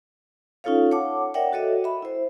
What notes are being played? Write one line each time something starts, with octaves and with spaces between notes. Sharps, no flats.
C#4 D#4 F4 A4 C#5 F5
C#5 F#5 A5 D6
A#4 C#5 D5 E5 F#5 G5
F#4 A4 C#5 D#5 E5
E5 B5
E4 C5